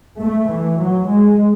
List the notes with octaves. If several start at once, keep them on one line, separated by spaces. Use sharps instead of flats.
A3
E3
F#3
G#3